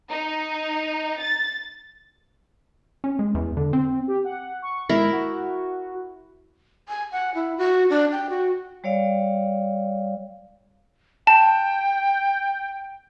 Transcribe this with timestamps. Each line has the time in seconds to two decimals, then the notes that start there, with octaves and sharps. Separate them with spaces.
0.10 D#4
1.21 A6
3.04 C#4
3.19 G#3
3.35 E2
3.57 D3
3.73 C4
4.08 G4
4.25 F#5
4.62 C#6
4.89 G#2 E4 A#4
5.12 F#4
6.89 G#5
7.12 F#5
7.35 E4
7.58 F#4
7.90 D4
8.12 G5
8.30 F#4
8.84 G3 C#5 D5 F5
11.27 G5 A5